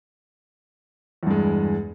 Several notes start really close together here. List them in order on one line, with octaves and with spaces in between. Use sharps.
E2 G2 G#3